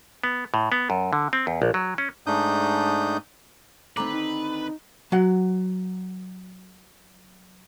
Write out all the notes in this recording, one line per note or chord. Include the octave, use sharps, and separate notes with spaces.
B3
A2
B3
F#2
D3
C4
E2
A#1
F#3
C#4
G#2 A3 D4 D#4 D#6 G6
D3 D#3 A3 C4 B4 A#5 D6
D#4
F#3 F#5